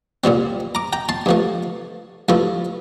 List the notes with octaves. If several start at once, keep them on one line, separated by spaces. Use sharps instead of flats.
C2 A#2 G3 C4
A#5 D6
G5 A#5
A5 C6
G2 F3 A3
G2 F3 A3 E4